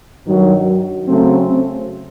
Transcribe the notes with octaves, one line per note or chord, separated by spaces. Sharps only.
G2 D#3 F#3
C#3 F#3 A3 C4